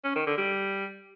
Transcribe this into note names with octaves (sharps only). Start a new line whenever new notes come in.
C#4
D#3
D3
G3